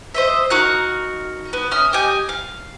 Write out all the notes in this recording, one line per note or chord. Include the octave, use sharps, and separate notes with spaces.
C5 D#5 E5
D#4 F#4 A#4 F#6
B3
C#4 E5 D#6 F6
G4 D#5 G#5 G6
F5